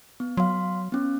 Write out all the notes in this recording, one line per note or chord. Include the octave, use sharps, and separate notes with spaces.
B3
F#3 F5 C6
B3 C#4